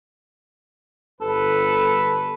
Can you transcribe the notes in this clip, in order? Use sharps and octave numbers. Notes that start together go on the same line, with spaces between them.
G1 A4 B4